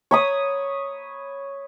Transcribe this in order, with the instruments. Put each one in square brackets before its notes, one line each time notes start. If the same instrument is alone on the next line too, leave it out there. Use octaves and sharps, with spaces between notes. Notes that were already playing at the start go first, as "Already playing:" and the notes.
[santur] C#5 B5 D#6